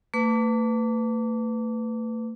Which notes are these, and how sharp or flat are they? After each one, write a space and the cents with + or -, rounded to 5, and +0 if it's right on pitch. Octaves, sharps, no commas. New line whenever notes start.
A3 +40 B4 +20 D6 -25